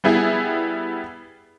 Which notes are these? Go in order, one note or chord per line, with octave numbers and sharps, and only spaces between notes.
G3 B3 E4 G#4